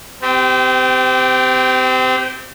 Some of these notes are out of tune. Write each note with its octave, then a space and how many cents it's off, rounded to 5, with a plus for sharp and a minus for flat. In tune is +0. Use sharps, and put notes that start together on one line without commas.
C4 -30 G4 +0